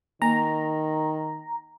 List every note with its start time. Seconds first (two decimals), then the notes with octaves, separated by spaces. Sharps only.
0.22 D#3 A#3 A#5